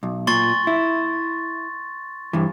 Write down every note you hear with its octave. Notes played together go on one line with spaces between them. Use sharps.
B1
A#2 C6 C#6 A6
E4
G2 E3